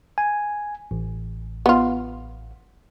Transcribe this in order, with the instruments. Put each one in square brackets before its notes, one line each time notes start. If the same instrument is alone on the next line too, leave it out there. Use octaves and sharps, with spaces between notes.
[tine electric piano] G#5
A1
[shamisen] B3 F4